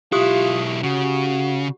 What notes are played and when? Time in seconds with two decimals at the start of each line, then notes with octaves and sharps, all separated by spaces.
0.12 B1 E4 F4 G4 D#6
0.84 C#3 F#4